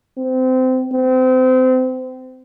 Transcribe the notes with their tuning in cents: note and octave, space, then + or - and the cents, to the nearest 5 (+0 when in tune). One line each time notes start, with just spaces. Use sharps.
C4 -25
C4 -30